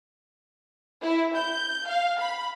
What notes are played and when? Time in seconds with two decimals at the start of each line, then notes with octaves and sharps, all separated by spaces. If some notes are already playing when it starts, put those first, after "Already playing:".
1.02 E4
1.36 G6
1.88 F5
2.20 B5